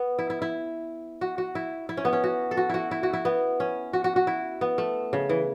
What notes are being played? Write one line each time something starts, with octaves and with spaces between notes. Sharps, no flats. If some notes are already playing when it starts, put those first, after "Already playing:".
Already playing: B3
E4
E4
E4
F#4
F#4
E4
E4
C#4
B3
C#4
F#4
A4
F#4
E4 F#4
E4
F#4
E4
B3
C#4
F#4
F#4
F#4
E4
B3
A3
C#3
E3